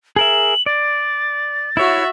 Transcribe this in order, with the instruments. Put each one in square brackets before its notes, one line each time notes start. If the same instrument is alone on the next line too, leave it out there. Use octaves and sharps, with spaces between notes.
[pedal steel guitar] G#4 A#4 E5 [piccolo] F#7
[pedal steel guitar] D5 [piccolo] A6
[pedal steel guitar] E4 C#5 [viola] F#4 E5